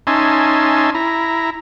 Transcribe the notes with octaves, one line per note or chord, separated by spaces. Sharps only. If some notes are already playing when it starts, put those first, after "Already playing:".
C#4 D#4 E5 G#5 A5 C6
E4 A#5